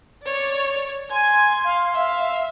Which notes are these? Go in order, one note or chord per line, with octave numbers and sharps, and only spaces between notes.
C#5 D5
G#5 C6 G#6
F5
E5 F5